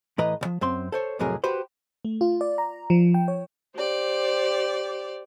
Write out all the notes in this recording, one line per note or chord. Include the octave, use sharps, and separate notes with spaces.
A2 E3 B4 D#5 A#5
C#2 F3
F#2 C4 C6
A4 C5 C#5
F2 A2 C3 F#3 G#4 A#4
F#4 G4 B4 C5
A3
F4
D5
A#5
F3
G5
C#5
G4 C5 D5